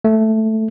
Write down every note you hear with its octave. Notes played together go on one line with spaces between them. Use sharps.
A3